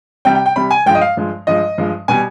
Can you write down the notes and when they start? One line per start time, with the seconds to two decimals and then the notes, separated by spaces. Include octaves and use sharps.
0.25 C3 G3 G5
0.35 G5
0.46 G5
0.56 C3 G3 B5
0.71 G#5
0.86 G2 F3 G#3 G5
0.95 D#5
1.01 F5
1.17 G2 F3 G#3
1.47 G2 F3 G#3 D#5
1.78 G2 F3 G#3
2.08 B2 G3 G#5